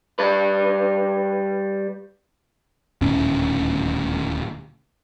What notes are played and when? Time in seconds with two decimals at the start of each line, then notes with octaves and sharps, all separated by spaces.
0.19 G3 B4
3.01 D#1 D2 A2 C#4